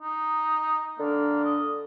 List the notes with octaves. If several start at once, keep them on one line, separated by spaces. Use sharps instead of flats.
D#4
D3 A#3
D#5